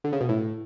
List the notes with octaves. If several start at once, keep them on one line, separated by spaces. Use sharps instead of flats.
D3
C#3
B2
A2